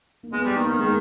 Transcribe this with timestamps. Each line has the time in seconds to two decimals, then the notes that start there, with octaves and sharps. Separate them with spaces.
0.23 A#3
0.32 G#3 B3
0.44 G3
0.55 D#3 A#3
0.67 D#3
0.78 D#3 G#3